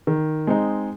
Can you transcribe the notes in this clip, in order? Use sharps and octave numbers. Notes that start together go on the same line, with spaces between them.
D#3
G#3 C4 D#4